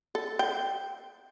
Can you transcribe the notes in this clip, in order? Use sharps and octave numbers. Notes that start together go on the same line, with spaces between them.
A4
G5